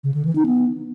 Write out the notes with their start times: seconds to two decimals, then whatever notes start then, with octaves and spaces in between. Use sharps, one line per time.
0.04 C#3
0.14 D3
0.25 E3
0.35 D#4
0.46 B3